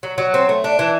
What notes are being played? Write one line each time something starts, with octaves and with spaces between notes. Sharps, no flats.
F#3
F#3
C4
A3
D4
E3